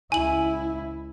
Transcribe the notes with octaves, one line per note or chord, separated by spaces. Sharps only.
C#2 E4 G#5 F#7